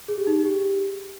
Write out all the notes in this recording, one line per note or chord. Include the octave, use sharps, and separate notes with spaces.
G#4
G4
D#4
G#4
G4